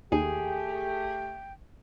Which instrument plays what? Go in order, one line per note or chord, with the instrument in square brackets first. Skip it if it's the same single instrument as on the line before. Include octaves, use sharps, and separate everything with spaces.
[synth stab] D#2 [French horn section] A3 G4 [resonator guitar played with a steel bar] G#4 [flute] G5